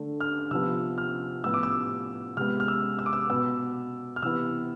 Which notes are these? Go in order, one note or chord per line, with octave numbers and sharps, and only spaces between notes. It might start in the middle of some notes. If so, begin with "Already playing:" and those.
Already playing: D3 A3
F6
C3 F3 B3 E6
F6
A2 F3 B3 E6
D6
E6
C3 G#3 B3 F6
F6
E6
E6
D6
E6
B2 B3 E6
F6
C3 E3 B3 E6